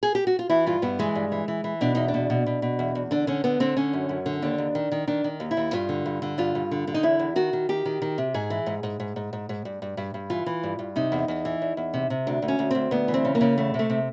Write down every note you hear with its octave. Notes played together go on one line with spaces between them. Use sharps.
G#4
G4
F#4
F4
E3 E4
G2 F4
G2 B3
E3 G#3
G2
E3
E3
E3
B2 D4
E2 D#4
D4
B2
B2
B2
B2
E2
E2
D3 D4
D3 C#4
D3 B3
D3 C4
D3 C#4
F#2
F#2
D3
D#2 D4
D#2
D#3
D#3
D#3 D4
D#3
D#2
E4
D#2
G2 F4
D3
G2
D3
G2 F4
G2
D3
D3
D#4
E2 E4
E2
D#3 F#4
D#3
D#3 G4
D#3
D#3
C3
G#2 G#4
E3
G#2
G#2
G#2
G#2
G#2
G#2
G2
G2
G2
G2
E3 F4
E3
G2
G2
C3 D#4
E2
E2
E3
E2
E2
C3
C3
D2 D4
D2
C#4
D2
D2 C4
D2 B3
E3
C4
C#3
A#3
C#3
E2 A3
C3
A3
C3